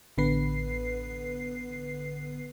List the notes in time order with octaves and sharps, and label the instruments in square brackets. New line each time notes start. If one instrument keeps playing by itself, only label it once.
[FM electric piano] A1 D3 B3 B4 C7